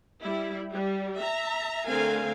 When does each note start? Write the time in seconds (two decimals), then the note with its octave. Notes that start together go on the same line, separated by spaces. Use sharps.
0.21 G3 E4
0.71 G3
1.17 E5 A#5
1.86 D3 A3 C4 A#4 F5 G#5